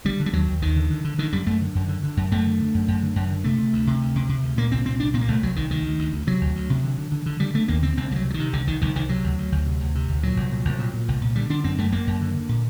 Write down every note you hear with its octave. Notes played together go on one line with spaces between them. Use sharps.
D3 G3
D3
G3
D#2 F#3
D#2
D#2 D#3
D3
D3
D3
D3 D#3
F#2 G3
F#2 A3
D3
F#2
D3
D3
F#2
F#2 A3
D3
D3
F#2
F#2
D3
F#2
D3
C3 A3
C3
D2
C3
D2
C3
C3
D2
A#2 A#3
C2 C4
A#2 C4
C2 D4
A#2 C4
A#3
C2 A3
C2 F#3
C2 D#3
D2 D#3
D2
D2
D2
C3 F#3
D2
D2
C3
D3
D3
D3
D3
D3 G3
D3 A3
D#2 A#3
D3 C4
C2 C4
C2 F#3 G3
C3
F#3
D#3
C3
C2 D3
C2 D#3
C2 D#3
C2 D#3
C3 F#3
D2
D2
D2
C3
D2
C3
D2
A#2 F#3
C2
A#2
C2
A#2
A#2
C2
A#2
D3 G3
D3 D4
F#2 C4
F#2 A3
F#2 A#3
F#2
D3
D3
A#2